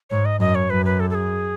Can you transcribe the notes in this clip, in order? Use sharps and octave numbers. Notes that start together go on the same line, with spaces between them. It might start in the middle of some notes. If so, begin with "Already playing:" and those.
G#2 C#5
D#5
F#2 D#5
C#5
F#2 B4
B4
A4
A4
G#4